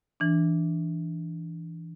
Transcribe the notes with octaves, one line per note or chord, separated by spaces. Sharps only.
E3 D4